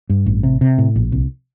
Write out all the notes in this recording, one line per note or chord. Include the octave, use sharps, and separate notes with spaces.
G2
A1
C3
C3
A2
A#1
C2